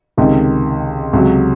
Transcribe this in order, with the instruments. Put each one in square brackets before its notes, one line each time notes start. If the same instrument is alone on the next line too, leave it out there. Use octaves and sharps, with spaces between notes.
[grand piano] C#2 C3 D#3
C#2 C3 F#3